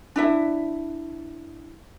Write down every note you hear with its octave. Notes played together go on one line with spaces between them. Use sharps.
D4 E4 E5